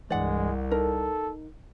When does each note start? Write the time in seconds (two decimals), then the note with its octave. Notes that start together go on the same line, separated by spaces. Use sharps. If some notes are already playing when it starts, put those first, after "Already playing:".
0.10 C2 G2 E3 G#3 D5 F#5
0.71 D#4 A4 A#4